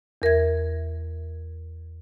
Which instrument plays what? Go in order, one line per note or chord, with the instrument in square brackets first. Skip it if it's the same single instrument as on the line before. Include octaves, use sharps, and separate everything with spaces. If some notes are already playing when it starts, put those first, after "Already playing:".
[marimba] E2 A#4 E5 G#6